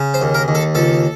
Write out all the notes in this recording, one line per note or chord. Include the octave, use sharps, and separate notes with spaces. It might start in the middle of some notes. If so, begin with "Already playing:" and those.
Already playing: C#3
C5
D#2
A#4
D#2
A4
C#2 A4